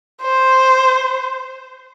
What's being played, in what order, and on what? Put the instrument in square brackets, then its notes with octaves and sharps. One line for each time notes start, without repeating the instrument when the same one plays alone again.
[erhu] C5